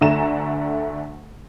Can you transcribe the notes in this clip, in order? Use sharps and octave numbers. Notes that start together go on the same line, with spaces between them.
D2 D3 A3 G#5 A#5 E7